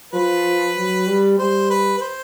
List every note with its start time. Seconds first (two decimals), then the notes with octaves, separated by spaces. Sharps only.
0.14 F3 B4
0.77 F#3
1.07 G3
1.38 G3 C5
1.70 B4
1.97 B4
2.01 C5